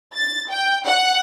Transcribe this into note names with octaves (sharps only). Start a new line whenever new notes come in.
A6
G5
F#5